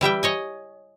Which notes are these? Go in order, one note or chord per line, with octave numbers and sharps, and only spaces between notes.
E3 G3 E5 G5
C#5 D#5 G#5